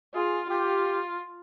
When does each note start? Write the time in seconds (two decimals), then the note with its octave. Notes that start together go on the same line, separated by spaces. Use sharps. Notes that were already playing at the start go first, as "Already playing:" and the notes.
0.15 F4 G#4
0.50 F4 G4